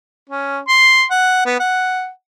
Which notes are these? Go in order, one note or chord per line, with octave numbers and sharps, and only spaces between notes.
C#4
C6
F#5
B3
F#5